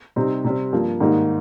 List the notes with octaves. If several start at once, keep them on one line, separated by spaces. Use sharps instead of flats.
C3 G3 C4 D#4
C3 G3 C4
G2 F3 A#3
G#2 D#3 G3 A#3 D#4